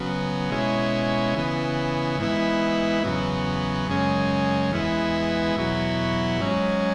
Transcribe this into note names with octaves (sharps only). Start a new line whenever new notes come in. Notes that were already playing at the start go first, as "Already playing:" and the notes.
Already playing: C#3 F#3 B3
B2 G#3 C#4 E4
C#3 E3 B3
G#2 E3 B3 E4
E2 C#3 F#3 B3
F#2 C#3 G#3 C#4
E2 E3 G#3 B3 E4
E2 B2 F#3 E4
G#2 F#3 C#4